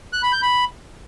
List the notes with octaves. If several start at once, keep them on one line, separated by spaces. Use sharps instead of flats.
F#6
B5
G6
B5